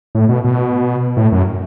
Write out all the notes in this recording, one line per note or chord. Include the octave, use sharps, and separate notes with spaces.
A2
B2
B2
A2
F#2